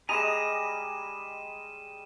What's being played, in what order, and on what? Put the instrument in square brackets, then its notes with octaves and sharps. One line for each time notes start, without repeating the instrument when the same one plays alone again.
[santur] G3 G#3 D#5 [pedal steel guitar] G#5 A#5 D#6 [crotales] D#7 E7